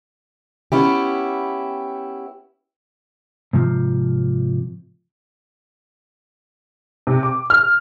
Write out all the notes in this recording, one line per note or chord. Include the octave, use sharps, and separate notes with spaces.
B3 C#4 E4 G4
G#2 C3 F3
C3
D6
F6